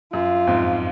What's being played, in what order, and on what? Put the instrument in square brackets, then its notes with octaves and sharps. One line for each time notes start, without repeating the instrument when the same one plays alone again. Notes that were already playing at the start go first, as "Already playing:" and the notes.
[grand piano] F#2 [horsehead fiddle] F4
[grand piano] F2 G#2